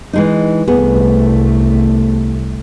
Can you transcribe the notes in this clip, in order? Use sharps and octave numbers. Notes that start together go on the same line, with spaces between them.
E3 G#3 D#4
C2 A3 B3 G#4